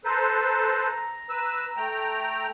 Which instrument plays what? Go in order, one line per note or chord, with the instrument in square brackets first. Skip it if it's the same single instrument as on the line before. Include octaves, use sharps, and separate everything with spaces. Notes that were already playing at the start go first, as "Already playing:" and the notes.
[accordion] A4 B4 C5 [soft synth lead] A#5
[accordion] B4 E6
A3 G5 A#5